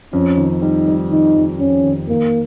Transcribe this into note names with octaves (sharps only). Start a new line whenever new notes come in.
F2 C#4
D#3
G3 D#4
G3
D#3 D#4
F2
F2 C#4
D#3
D#3 A#3